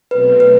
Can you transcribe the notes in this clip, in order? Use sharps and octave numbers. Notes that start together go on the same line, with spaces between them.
B2 F#3 A3 C4 B4
B4